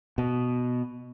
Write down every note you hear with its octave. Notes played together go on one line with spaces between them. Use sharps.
B2